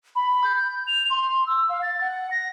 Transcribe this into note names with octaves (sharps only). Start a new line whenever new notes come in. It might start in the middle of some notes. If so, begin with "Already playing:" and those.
B5
G6
F7
C6
E6
F5
A6
F#5
A#6